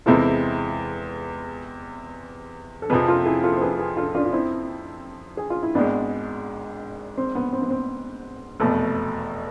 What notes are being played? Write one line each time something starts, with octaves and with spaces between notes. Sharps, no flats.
E2 C3 G#3 C4 E4 F4 A4
A4
F2 C3 F3 G#4 B4
F4 A4
E4 G#4
F4 A4
C5
G#4 B4
G#4 B4
F4 A4
D4 F4
F4
C4 E4
G#4
F4
E4
G#1 G#2 G#3 B3 D4
C4
B3
C4
B3
C4
F1 E2 B2 A3